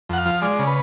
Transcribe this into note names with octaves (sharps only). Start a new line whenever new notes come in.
F2 F#5
F5
F3
G#3 D5
C#3
B4